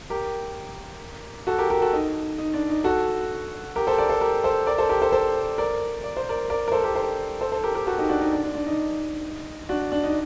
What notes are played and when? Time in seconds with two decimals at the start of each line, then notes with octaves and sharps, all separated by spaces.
0.10 G4 A#4
1.47 F#4 A4
1.59 G4 A#4
1.70 G4 A#4
1.82 F#4 A4
1.93 D#4
2.38 D#4
2.54 D4
2.69 D#4
2.84 F#4 A4
3.76 G4 A#4
3.87 A4 C5
3.98 A#4 D5
4.09 A4 C5
4.21 G4 A#4
4.44 A4 C5
4.67 A#4 D5
4.78 A4 C5
4.89 G4 A#4
5.01 A4 C5
5.12 A4 C5
5.58 A#4 D5
6.04 D5
6.17 C5
6.29 A#4 D5
6.50 A#4 D5
6.68 A#4
6.72 A4 C5
6.84 G4 A#4
6.95 A4 C5
7.41 A4 C5
7.52 A4 C5
7.64 G4 A#4
7.75 G4 A#4
7.86 F#4 A4
7.98 D#4 G4
8.09 D4 F#4
8.21 D#4
8.32 D4
8.43 D4
8.55 D4
8.66 D#4
9.69 D4 F#4
9.92 D4
10.03 D#4